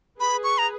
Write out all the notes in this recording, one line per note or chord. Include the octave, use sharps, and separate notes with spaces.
G#4 B4 B5
C#6
A#5